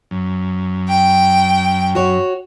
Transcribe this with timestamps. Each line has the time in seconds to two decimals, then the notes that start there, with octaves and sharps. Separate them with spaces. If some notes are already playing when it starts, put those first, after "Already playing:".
0.11 F#2
0.89 G5
1.95 F#4 C#5